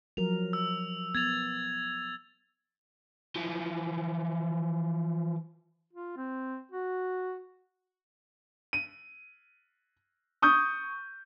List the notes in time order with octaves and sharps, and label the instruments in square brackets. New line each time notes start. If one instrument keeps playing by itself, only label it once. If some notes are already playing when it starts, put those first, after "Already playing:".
[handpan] F3 F#3 A#4 [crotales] F7
[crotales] E6
[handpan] B3 [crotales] G#6 A6 F7
[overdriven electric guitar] E3 F3
[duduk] F4
C4
F#4
[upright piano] D#7
C#6 D#6 G6